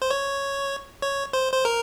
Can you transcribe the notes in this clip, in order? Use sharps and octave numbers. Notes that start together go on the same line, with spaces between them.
C5
C#5
C#5
C5
C5
A#4